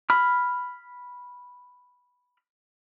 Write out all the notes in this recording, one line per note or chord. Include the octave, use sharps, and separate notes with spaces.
B5 F6